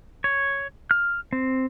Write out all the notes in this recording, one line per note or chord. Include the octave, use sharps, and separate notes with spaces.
C#5
F6
C4